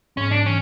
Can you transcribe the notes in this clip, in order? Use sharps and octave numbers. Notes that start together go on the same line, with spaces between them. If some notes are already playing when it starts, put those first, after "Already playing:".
G#2 C#4
D4
E3 C#4